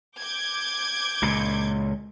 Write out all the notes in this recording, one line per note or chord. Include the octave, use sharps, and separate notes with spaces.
D6 G6 G#6
C#2 A#2